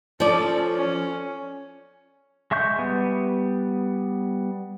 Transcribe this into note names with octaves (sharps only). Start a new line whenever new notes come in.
F3 C#4 A4 D5
C#4
G#3 E5 C#6 G6
G3 B3